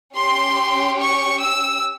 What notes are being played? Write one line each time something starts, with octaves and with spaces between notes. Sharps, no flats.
C#4 G4 C6
C#6
E6